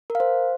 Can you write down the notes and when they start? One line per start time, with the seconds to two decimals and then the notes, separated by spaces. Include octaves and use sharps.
0.10 A#4
0.15 F5
0.20 C5